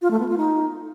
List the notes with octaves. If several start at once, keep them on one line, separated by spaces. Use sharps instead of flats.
F4
A3
B3
F4
D#4